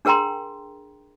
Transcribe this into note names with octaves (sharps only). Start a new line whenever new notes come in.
D4 G#4 A#4 G5 A#5 C6